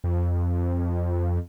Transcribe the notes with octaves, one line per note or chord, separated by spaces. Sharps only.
F2